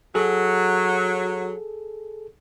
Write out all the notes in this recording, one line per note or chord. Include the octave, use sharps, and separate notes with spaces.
F#3 G#4 A4